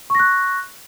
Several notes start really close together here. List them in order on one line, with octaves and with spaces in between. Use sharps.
C#6 A#6 F#6